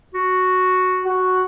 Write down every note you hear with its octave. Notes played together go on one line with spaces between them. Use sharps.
F#4
F#4